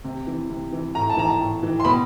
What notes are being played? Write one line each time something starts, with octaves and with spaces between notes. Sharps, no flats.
C3
E3
C3
E3
A2 A#5
A5
E3 A#5
A5
A2
E3
C6
B2 B5